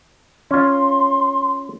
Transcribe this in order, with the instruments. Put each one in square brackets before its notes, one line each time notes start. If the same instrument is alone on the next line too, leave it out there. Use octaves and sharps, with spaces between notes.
[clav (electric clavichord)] C#4 F4 [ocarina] C6